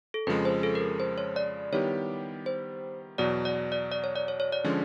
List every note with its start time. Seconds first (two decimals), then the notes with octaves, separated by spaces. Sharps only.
0.14 A4
0.27 F2 C#3 F3 G#3 B4
0.45 C5
0.63 A4
0.75 A#4
1.00 C5
1.18 C#5
1.36 D5
1.72 D#3 G3 B3 E4 G4 C#5
2.46 C5
3.18 E2 B2 F#3 D5
3.45 D5
3.72 D5
3.92 D5
4.04 C#5
4.16 D5
4.28 C#5
4.40 C#5
4.52 D5
4.64 D3 F3 G#3 C#4 C#5